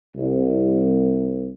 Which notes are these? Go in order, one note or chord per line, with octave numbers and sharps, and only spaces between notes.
C2